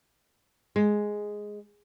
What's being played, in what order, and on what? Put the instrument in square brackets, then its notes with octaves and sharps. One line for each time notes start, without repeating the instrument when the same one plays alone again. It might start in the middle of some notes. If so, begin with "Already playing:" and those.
[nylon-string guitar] G#3